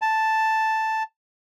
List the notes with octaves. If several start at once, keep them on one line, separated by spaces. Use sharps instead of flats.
A5